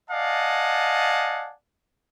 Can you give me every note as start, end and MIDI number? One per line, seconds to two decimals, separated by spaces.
0.10 1.53 74
0.10 1.53 75
0.10 1.53 77
0.10 1.53 78
0.10 1.53 80
0.10 1.53 81